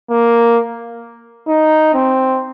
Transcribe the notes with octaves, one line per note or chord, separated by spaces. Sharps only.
A#3
D#4
C4